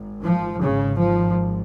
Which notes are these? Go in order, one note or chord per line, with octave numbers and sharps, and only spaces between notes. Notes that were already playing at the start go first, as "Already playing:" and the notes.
Already playing: G#1 G#2
F3
G#1 G#2 C#3
F3